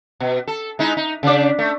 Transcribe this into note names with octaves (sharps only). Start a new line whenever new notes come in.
B2
A4
G#3 D#4 E4
D#4
C#3 D4 D5
A3